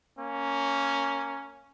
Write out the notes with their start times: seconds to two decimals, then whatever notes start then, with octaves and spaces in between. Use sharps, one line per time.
0.18 A#3 C#4